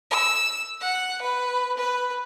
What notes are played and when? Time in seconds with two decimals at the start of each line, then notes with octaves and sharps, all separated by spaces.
0.11 E6
0.81 F#5
1.21 B4
1.77 B4